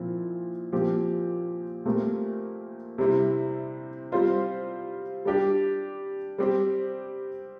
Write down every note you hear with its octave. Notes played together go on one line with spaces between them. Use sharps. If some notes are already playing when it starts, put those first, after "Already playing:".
Already playing: A#2 F3 C4 E4
A#2 F3 C4 G4
A#2 A3 C4 G4 A#4
C3 G3 C4 E4
G3 C4 F4 C5
G3 D4 G4
G3 C4 G4 C5